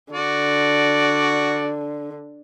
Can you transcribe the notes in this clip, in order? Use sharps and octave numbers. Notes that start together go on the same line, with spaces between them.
D3 F#4 D5